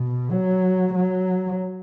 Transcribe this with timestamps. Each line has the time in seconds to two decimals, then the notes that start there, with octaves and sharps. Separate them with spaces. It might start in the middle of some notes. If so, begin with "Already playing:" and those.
Already playing: B2
0.31 F#3
0.93 F#3